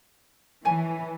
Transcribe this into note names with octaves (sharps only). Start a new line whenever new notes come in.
E3 C#5 G#5 A5